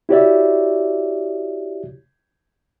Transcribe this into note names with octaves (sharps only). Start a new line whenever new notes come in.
E4 F#4 G4 C#5 D5 E5